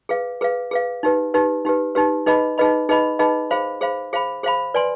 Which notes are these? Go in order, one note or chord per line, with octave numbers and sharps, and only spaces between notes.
G#4 B4 F5
G#4 B4 F5
G#4 B4 F5
D#4 G4 B4
D#4 G4 B4
D#4 G4 B4
D#4 G4 B4
D#4 G#4 B4 D#5 B5
D#4 G#4 B4 D#5 B5
D#4 G#4 B4 D#5 B5
D#4 G#4 B4 D#5 B5
G#4 C5 F5 B5
G#4 C5 F5 B5
G#4 C5 F5 B5
G#4 C5 F5 B5
B4 D5 G#5 C6